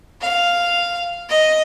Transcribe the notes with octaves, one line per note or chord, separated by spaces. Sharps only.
F5
D#5